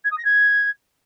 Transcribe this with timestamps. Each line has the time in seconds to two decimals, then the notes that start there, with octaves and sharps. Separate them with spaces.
0.04 G#6
0.11 D#6
0.18 A#6
0.24 G#6